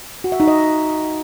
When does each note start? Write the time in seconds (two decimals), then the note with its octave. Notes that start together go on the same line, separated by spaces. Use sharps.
0.24 F#4
0.32 E5
0.40 D#4
0.48 D#5